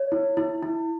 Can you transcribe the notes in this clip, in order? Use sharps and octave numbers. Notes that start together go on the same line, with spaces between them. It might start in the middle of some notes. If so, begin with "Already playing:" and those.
Already playing: C#5
E4
E4
E4